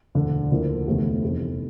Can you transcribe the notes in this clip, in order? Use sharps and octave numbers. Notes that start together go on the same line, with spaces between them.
E1 D2 D3
D2 D3 F3 A#3 E4
F1 E2 C3 E3 A3
F1 E2 C3